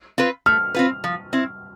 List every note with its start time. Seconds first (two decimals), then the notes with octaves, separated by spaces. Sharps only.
0.18 C4 F4 B4
0.46 A3 F6
0.75 C4 F4 B4
1.04 F3
1.33 C4 E4